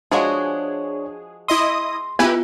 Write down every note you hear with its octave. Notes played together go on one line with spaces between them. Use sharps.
F3 G#3 D4 F#4 G#4 C#5
E4 D#5 C6 D#6
B3 E4 F4 G4 B4 G#5